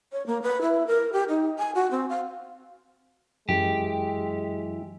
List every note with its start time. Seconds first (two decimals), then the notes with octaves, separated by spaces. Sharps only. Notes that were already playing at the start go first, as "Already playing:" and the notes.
0.12 C#5
0.27 A#3
0.42 B4
0.62 E4
0.87 A#4
1.13 G4
1.29 D#4
1.58 G#5
1.75 F#4
1.91 C4
2.09 F5
3.49 F#2 E3 F#3 G#3 E4 G4